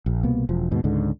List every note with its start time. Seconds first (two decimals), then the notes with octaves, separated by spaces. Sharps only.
0.06 A#1
0.23 C2 B2 A#3 B3
0.49 E1 F3
0.71 D#2 G#2 B2
0.84 C#2 G#2 D3